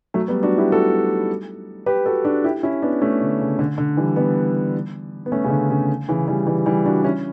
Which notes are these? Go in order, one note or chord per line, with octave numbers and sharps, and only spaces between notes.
F#3 A3
G3 B3
D4 F#4
E4 G4
F#4 A4
G4 B4
F#4 A4
D4 F#4
E4 G4
C#4 E4
B3 D4
A3 C#4
D3
C#3
D3
D3
E3 G3
G3 B3
B3
A3 C#4
C#3
D3
C#3
C#3 E3
E3 G3
E3 G3
E3 G3
D4 F#4
C#4 E4